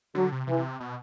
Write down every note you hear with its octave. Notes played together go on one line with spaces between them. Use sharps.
D3 F#3
C3
C3 E3
B2